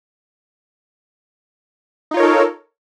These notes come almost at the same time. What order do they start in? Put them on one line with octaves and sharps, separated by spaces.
D#4 F4 C#5 A#4 A4